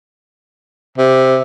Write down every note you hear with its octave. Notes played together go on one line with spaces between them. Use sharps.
C3